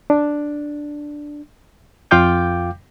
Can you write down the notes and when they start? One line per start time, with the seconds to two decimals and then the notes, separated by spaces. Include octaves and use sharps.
0.10 D4
2.11 F2 F4 F5 G5 D6 G6